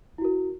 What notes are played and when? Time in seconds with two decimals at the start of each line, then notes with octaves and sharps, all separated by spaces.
0.18 E4
0.21 F#4
0.25 A#4